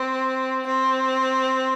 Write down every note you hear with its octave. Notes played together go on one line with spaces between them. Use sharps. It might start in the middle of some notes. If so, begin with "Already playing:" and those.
Already playing: C4
C4